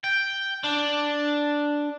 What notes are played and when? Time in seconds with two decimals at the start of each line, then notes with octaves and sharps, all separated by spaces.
0.04 G5
0.64 D4